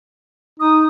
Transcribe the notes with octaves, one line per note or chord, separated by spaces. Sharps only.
D#4 D#6